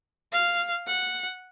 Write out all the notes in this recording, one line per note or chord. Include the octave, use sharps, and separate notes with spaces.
F5
F#5